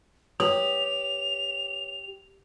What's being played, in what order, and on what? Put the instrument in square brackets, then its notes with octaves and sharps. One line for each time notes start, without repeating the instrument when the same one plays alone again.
[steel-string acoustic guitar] G4 [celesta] B4 C#5 F#7 [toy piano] D#6 [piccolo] F7